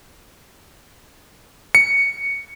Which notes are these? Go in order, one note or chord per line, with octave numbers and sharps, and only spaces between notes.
C#7